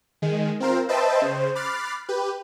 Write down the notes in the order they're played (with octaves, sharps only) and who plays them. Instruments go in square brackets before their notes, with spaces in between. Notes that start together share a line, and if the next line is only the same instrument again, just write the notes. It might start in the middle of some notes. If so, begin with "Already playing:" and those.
[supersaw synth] D#3 G#3
C4 F4 A#4 C5
B4 C5 D#5 E5 G5 A5
C#3 C5
B5 D6 F6 F#6 A6 C7
G4 B4